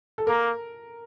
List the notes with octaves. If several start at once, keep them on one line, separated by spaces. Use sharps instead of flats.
A4
A#3 A#4